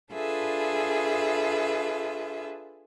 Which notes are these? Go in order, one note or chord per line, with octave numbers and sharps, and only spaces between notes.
D4 F4 G#4 A4 B4 E5